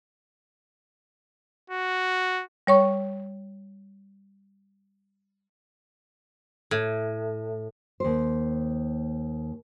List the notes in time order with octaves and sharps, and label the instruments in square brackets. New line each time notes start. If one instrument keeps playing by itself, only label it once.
[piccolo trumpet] F#4
[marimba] G3 C#5 C#6
[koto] A2
[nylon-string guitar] D#2 C5